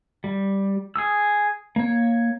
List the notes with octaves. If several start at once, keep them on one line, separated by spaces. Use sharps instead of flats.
G3
G#4 D#6 E6
A#3 C#5